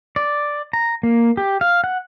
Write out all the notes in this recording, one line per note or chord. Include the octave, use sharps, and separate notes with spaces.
D5
A#5
A#3
G4
F5
F#5